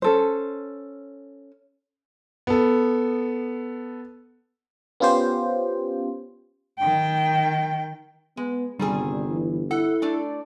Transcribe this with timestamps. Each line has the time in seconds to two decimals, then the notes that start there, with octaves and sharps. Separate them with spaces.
0.02 C#4 A4 C5
2.47 B3 A4
5.00 B3 C#4 F4 G4 C5
6.79 D#3 G5
8.37 G#3 B3
8.79 G1 C3 D#3 G3 C4 G#4
9.28 E3
9.71 E4 A4 F#5
10.02 A3 D4 D5